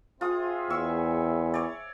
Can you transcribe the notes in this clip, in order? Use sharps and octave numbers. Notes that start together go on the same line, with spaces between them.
C4 F4 G#4 E5 D#6
E2 C#6 E6
C#5 D5